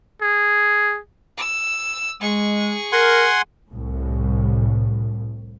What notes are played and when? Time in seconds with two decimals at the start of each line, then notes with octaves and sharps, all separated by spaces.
0.22 G#4
1.38 E6
2.22 G#3 G#4 C#6
2.92 A#4 F#5 G#5 C6
3.70 C2 A2